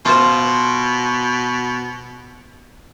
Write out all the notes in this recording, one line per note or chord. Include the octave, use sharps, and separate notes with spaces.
B2 F4 C5